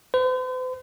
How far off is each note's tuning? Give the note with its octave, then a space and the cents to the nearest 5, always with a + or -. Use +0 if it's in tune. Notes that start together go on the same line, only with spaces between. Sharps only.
C5 -45